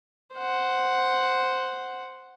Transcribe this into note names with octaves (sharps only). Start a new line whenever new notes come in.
C5 F#5